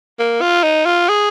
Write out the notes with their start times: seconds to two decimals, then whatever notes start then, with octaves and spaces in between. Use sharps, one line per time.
0.19 A#3
0.41 F4
0.63 D#4
0.86 F4
1.09 G#4